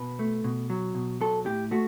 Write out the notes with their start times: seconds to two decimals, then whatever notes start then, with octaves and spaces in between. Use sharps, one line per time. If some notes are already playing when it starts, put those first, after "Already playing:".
Already playing: B2 B4
0.19 A3
0.44 B2
0.70 F#3
0.95 B2
1.21 F#3 A4
1.46 A2 G4
1.71 A3 F#4